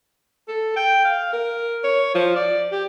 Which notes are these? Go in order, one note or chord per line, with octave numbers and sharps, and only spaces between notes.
A4
G5
F5
A#4
C#5
F3
D5
G4